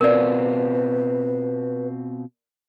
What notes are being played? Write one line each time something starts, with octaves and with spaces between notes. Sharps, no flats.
B2 C4 F4 A#4 B4 D5